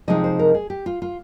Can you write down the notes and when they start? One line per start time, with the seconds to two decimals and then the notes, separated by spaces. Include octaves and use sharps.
0.08 C3 F3 G#3 C4 D#4 D#5
0.24 C5
0.39 A#4
0.54 G#4
0.70 G4
0.86 F4
1.02 F4